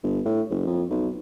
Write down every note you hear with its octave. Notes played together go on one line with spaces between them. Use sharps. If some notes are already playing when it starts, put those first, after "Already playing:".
G1
A2
F#1
F2
B1